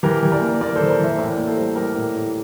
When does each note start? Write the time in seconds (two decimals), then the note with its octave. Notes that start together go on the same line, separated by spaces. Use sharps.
0.03 E3 G4 A#4
0.23 E3
0.32 A#4 D5
0.41 A#3
0.61 A#3 A#4 D5
0.76 E3 A4 C5
0.89 A#4 D5
0.99 E3 C5 E5
1.18 A2 A#4 D5
1.37 A#3
1.47 A4 C5
1.57 G3
1.76 G3 G4 A#4
1.95 A2
2.15 A2